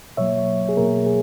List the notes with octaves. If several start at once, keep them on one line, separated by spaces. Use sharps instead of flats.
B2 F#3 A#3 C#5 E5
G#4
B2 F#3 A#3 A#4
G#4